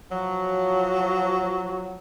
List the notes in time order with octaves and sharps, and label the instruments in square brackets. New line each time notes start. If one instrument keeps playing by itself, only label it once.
[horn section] F3 F#3